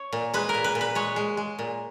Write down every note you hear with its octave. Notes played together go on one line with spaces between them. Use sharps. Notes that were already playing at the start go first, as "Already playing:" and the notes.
Already playing: C#5
A#2
G#3 B4
A#4
A#2
B4
A#2
B4
G#3 C#5
G#3
G#3
A#2